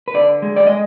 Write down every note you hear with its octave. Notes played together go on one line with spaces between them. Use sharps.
B4
D3 D5
G#3
D5
G#3 D#5